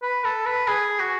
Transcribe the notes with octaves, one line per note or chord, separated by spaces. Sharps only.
B4
A4
B4
G#4
F#4